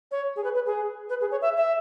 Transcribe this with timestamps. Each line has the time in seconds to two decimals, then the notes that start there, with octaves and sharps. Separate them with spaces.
0.12 C#5
0.36 G#4
0.44 B4
0.55 B4
0.66 G#4
1.10 B4
1.21 G#4
1.31 C#5
1.42 E5
1.57 E5